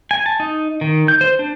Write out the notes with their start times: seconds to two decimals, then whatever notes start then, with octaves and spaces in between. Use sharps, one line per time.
0.11 G#5
0.26 A5
0.40 D#4
0.81 D#3
1.08 G6
1.21 C5
1.39 D4